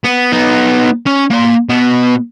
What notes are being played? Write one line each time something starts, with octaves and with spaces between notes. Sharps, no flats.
B3
B3 D#4
C#4
A#3 C6
B2 B3